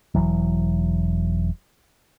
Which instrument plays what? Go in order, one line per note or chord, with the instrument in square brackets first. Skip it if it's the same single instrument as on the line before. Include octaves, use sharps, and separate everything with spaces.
[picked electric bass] E1 C#2 E3 F#3